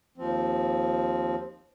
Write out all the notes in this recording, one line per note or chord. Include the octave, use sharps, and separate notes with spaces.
D#2 F3 C4